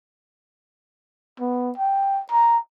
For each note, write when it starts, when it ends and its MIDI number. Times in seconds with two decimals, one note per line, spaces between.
1.40 1.72 59
1.78 2.21 79
2.31 2.58 82